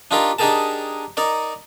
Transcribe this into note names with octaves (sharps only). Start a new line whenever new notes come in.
D4 D#4 F4 G4 A#4
D4 D#4 G4 G#4 A#4 A5
D#4 A#4 D5